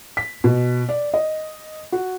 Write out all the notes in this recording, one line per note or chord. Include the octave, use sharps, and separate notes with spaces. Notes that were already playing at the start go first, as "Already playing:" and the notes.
B6
B2
D5
D#5
F#4